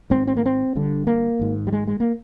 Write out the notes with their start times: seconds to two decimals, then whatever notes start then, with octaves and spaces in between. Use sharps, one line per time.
0.10 G#1 G#2 C4
0.27 C4
0.37 A#3
0.46 C4
0.75 G1 G2 D3
1.07 A#3
1.39 G#1 G#2
1.67 G3
1.73 G#3
1.87 G#3
2.00 A#3